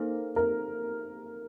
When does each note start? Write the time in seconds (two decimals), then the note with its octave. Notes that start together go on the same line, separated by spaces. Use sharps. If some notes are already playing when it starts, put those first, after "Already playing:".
Already playing: A#3 D#4 A4 A#4 C5 F5
0.36 A#4